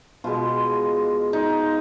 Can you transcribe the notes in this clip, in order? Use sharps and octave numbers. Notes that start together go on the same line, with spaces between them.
B2 G#3 F4
D#4